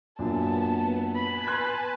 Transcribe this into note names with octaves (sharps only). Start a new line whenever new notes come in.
F#2 A#2 B3 D4 A5
B4 G#5 A5 B5
C6 F#6 G#6